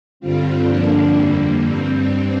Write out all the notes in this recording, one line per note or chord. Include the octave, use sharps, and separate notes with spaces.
G2 D3 G3 C4 F4
G2 D3 F3 A#3 D4
F2 D3 G3 A#3
G2 G3 C4